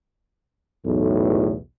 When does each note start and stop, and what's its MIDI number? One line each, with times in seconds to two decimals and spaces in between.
0.86 1.55 35
0.86 1.55 40
0.86 1.55 45